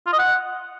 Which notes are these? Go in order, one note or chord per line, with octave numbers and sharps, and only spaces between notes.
F4
D#5
F#5